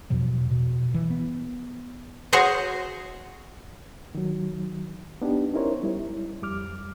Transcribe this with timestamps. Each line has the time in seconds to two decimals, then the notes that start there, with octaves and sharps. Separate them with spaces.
0.10 E2 B2 F3 F#3
0.51 B2
0.95 E3
1.10 B3
2.33 F#4 G#4 C5 C#5 D#5
4.15 D#3 F#3
5.22 B3 D4 D#4 G4
5.54 C#4 D#4 E4 A#4 C5 C#5
5.83 G3 E4
6.42 F2 G3 D6 F6